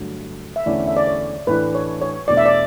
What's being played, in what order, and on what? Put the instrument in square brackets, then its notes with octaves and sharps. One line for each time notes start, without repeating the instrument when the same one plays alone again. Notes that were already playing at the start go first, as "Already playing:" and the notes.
Already playing: [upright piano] G2 D3 F#3 A3
[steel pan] E5
[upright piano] E2 D3 A3 C#4 E4 [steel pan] D5
[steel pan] E5
D5
C#5
[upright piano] A2 E3 A3 D4 [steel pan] B4
[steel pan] C#5
C#5
[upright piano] E2 B2 A3 D4 [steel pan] D5
[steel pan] E5
D5